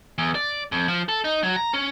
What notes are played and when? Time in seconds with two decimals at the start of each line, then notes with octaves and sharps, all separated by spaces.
0.18 E2
0.35 D5
0.72 F2
0.88 F3
1.09 A4
1.24 D#4
1.43 F#3
1.56 A#5
1.74 C#4